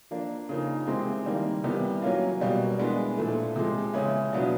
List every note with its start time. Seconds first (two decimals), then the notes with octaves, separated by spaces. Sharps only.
0.11 F3 A#3 D4
0.49 C#3 F3 A#3 D#4
0.87 C3 E3 G#3 C4
1.26 D#3 G3 A#3
1.64 C3 E3 G3 B3
2.02 F#3 A#3 C#4 F4
2.40 B2 G3 A#3
2.78 E3 G#3 B3 D4
3.17 A#2 F3 A3
3.56 C3 F3 G#3
3.94 C#3 E3 G#3 C#4 E4
4.33 B2 F#3 B3 D4 F4